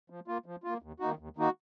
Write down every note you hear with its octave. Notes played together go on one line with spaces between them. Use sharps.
F3
A#3 F4
F3
A#3 F4
D#2
D#3 A#3 D#4 F#4
D#2
D#3 A#3 D#4 F#4